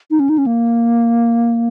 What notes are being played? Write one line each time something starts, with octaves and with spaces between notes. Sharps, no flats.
D#4
C#4
D#4
C#4
A#3